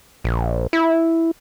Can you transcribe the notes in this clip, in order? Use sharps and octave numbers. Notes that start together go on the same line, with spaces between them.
A#1
E4